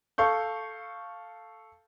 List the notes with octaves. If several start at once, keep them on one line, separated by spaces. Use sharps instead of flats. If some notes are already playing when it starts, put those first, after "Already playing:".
A4 F5 C#6 G6